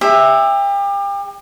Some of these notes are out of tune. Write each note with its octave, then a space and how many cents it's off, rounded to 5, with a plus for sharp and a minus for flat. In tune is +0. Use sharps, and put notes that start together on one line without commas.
G4 +35 E5 +0